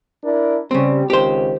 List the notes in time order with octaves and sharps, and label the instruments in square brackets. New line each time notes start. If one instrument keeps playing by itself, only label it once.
[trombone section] D4 E4 A#4
[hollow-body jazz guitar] C#3 C4 [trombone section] G3
[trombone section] C#2 D#3 C4 [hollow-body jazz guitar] G4 C5